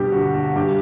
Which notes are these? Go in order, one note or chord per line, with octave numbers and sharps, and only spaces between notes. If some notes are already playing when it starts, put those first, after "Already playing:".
Already playing: G2 B2 G4
D3 F#4
F#4
G2 G4